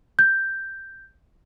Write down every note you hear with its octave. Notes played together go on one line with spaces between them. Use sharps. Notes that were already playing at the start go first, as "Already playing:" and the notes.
G6